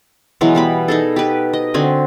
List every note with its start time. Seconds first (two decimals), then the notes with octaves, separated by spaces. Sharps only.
0.41 B2 E3 F#3 G#3
0.55 G3 B3 B5
0.88 D#4 G#4 A4
1.16 G4 B4
1.53 D#5
1.74 D3 C4 F#4 G#5